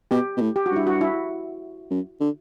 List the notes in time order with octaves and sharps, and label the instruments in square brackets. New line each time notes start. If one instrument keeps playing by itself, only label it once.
[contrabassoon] B2 [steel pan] G4
[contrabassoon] B2
A2
[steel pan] G4
F#4
[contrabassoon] G2
[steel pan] E4
F#4
E4
[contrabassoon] F#2
D3